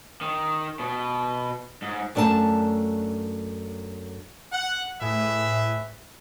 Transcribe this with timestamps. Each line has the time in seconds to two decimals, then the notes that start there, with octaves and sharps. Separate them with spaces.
0.21 D#3
0.79 B2
1.82 G#2
2.15 F#2 A3 D4 A#4 A5
4.52 F#5
5.01 A2 G#4 B4 E5